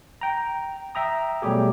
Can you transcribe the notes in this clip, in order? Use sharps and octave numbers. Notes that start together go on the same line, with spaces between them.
G5 A#5
E5 G5 A#5 D#6
B2 F#3 G3 A3 G4 G#4